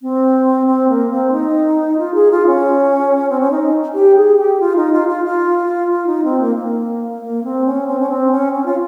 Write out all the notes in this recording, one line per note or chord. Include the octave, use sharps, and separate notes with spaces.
C4
C4
A#3
C4
D#4
F4
G#4
F4
C#4
C4
C#4
D#4
G4
G#4
G4
F4
D#4
F4
F4
F4
F4
D#4
C4
A#3
A#3
A#3
C4
C#4
C4
C#4
C4
C#4
C#4
F4